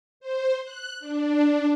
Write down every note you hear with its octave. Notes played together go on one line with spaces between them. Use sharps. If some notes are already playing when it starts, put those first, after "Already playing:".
C5
F#6
D4